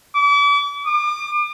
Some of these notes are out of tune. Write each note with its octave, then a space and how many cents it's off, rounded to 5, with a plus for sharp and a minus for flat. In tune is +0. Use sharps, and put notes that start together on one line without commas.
D6 -40
D6 +40